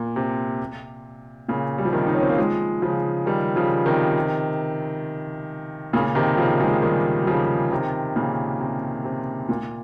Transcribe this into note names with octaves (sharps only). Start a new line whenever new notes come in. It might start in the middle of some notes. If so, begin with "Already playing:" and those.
Already playing: A#2
C3
A#2 C#3
G3
F3
C3 D#3
D#4
C#4
C4
A#3
F3 G#3
C#3 F3
D#3 G3
C#3 F3
C3 D#3
A#2 C#3
C3 D#3
C#3 F3
F3 G#3
D#3 G3
G3
C#3 F3
C3 D#3
A#2 C#3
C3
C3
A#2